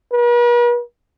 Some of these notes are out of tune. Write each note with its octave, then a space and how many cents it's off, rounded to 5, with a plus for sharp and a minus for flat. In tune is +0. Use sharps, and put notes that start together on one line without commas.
B4 -45